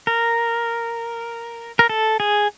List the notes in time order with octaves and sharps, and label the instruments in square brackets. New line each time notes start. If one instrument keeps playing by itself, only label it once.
[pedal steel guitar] A#4
A#4
A4
G#4